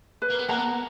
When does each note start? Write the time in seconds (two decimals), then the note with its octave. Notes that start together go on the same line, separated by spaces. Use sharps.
0.22 B4
0.30 A#3
0.39 B3
0.48 A#3 F#5 A#5
0.58 B3